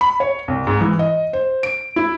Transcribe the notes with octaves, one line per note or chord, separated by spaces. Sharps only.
B5
C#5
C2
G#2
E3
D#5
C5
D7
E4